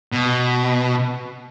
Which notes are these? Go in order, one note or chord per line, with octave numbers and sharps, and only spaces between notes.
B2